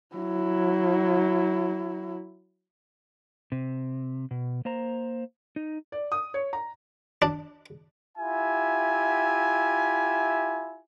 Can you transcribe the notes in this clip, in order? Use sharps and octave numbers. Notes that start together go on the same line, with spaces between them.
F#3 E4
C3
B2
A#3 C5 A#5
D#4
D5
D#6
C#5
A#5
D4
E4 F4 G4 E5 G#5